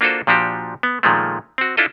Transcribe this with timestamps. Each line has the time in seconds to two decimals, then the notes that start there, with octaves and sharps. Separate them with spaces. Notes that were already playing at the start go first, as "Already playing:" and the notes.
0.01 A#3 D4 F4 F#4 A4 C5
0.27 A#2 F3 D4 F#4 G4
0.83 B3
1.03 A#2 D#3 F3 G#3 A3
1.58 C4 F#4
1.77 D4 E4 F4 A4 D#5